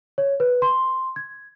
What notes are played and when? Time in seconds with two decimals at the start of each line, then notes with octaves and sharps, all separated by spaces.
0.18 C#5
0.40 B4
0.62 C6
1.16 G#6